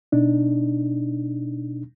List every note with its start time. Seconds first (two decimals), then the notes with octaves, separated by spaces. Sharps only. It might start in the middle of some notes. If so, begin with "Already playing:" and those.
0.12 B2 D4 D#4